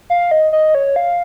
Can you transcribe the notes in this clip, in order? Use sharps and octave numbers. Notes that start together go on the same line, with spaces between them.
F5
D#5
D#5
C#5
F5